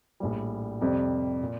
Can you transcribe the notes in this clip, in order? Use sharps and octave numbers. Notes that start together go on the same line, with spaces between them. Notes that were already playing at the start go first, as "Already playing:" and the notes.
A#1 A2 G3
F2 C3 G3
A#2